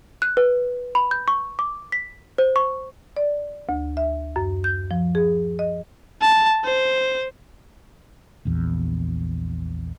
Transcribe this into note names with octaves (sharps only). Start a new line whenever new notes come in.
F#6
B4
B5
G6
C#6
D6
B6
C5
C#6
D5
D2
E5
F#2
G6
F3
G#4
D#5
A5
C5
A#1 E2